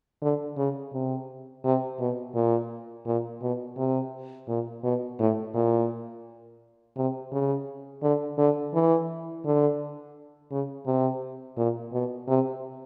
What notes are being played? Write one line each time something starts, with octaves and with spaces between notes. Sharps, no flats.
D3
C#3
C3
C3
B2
A#2
A#2
B2
C3
A#2
B2
A2
A#2
C3
C#3
D3
D3
E3
D3
C#3
C3
A#2
B2
C3